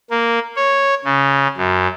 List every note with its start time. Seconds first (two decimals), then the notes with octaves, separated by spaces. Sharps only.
0.10 A#3
0.56 C#5
1.05 C#3
1.57 F#2